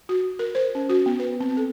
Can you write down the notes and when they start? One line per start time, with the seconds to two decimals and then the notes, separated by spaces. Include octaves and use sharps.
0.09 F#4
0.39 A#4
0.55 C5
0.75 C#4
0.89 F#4
1.06 B3
1.20 B4
1.40 C4
1.57 A4